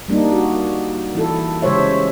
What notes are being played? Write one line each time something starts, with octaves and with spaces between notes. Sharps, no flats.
G3 A#3 D4 D#4
F#4
E3 E4 A4
C#3 G#3 G4 C5 C#5 E5